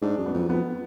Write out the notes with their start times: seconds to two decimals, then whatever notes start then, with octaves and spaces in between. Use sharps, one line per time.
0.02 G#2 D4
0.18 F#2
0.26 B3
0.34 F2
0.49 F2 B3